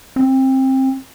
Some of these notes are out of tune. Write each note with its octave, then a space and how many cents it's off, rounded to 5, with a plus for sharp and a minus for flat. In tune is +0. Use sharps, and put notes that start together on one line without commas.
C4 +20